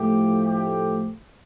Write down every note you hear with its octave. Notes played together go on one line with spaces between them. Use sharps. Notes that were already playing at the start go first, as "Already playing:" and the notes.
Already playing: A2 F3 A3 G4
G4